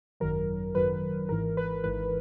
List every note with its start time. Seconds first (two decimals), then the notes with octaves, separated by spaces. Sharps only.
0.20 G#1 F#2 D#3 F#3 A#4
0.75 G#1 F#2 D#3 F#3 B4
1.29 G#1 G#2 E3 A#4
1.57 B4
1.83 G#1 G#2 E3 B4